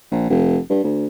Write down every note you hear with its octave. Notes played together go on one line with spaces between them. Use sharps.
A#1
F1
G2
D2